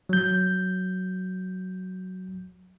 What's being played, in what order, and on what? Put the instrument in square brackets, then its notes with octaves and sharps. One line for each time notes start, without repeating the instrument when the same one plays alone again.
[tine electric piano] F#3 G6